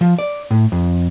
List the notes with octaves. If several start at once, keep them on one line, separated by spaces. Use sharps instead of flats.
F3
D5
A2
F2